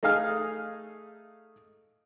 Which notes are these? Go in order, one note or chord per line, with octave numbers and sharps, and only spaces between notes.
A3 D#4 G#4 F5 F6